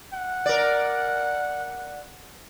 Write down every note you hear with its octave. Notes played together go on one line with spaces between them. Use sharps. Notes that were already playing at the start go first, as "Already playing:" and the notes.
F#5
A#4 D5